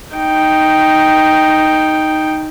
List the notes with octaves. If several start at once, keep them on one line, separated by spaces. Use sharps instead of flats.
D#4 G5